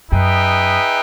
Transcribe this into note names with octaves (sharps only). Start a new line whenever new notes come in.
F#2 D#4 G#4 B4 E5 G5